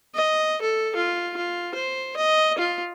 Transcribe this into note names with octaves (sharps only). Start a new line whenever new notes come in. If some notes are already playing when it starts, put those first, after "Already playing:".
D#5
A4
F4
F4
C5
D#5
F4